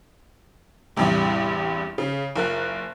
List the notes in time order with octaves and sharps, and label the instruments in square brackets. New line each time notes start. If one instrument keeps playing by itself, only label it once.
[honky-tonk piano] A1 E2 G2 C3
C#3
F#1 F4 A#4 F#6